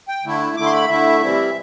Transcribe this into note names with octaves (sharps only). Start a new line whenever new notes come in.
G5
D3 A3 E4
D3 A3 E4 D6
C6
B5
D3 A3 E4 E5
C3 E3 G3 C4 E4